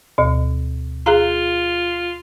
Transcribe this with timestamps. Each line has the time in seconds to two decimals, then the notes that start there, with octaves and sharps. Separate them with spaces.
0.18 D2 B2
1.06 F4 G#4 F5 A#5